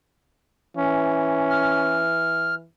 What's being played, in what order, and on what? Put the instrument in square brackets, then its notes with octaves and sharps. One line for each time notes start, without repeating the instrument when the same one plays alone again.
[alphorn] E3 [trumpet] C#4
[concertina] F6